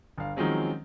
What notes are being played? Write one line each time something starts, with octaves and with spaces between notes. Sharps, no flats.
G1 F5
D#3 F3 F#3 G#3 C4 C#4